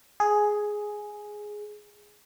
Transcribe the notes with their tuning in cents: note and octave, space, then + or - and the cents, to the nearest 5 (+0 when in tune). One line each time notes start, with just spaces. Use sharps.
G#4 +5